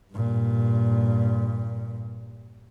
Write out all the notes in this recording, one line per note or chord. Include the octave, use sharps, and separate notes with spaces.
G2 A#2